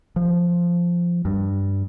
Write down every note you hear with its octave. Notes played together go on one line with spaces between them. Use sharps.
F3
G2